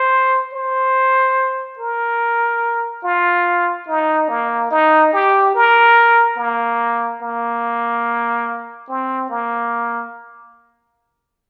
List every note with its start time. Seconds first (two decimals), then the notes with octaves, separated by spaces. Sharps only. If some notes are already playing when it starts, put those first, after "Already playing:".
Already playing: C5
0.53 C5
1.79 A#4
3.04 F4
3.88 D#4
4.29 A#3
4.71 D#4
5.13 G4
5.55 A#4
6.38 A#3
7.22 A#3
8.89 C4
9.30 A#3